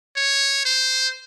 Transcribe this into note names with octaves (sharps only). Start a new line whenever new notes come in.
C#5
C5